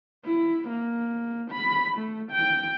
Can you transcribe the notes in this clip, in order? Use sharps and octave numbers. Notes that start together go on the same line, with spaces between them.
E4
A#3
B5
A3
G5